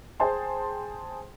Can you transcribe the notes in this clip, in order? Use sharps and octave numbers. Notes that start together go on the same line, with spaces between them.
G#4 C5 G5 A5 C6